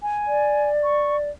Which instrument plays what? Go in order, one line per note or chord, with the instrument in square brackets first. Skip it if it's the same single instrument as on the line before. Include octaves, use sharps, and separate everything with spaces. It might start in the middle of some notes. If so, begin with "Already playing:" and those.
[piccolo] G#5
[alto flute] D5
[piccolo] C#6